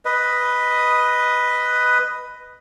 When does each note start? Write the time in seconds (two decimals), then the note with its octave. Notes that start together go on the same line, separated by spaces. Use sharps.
0.05 B4 D#5